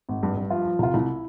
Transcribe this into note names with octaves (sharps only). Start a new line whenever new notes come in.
G#1
G2
G2
F3 F4
F3
C2 F4
C2 E4